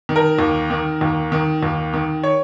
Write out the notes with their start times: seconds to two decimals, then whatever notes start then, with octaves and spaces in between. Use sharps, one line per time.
0.09 D#3
0.16 A#4
0.39 D#2
0.70 D#3
1.01 D#2
1.32 D#3
1.63 D#2
1.94 D#3
2.24 C#5